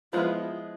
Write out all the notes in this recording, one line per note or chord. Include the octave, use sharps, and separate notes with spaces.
F3 G#3 B3 E4 F4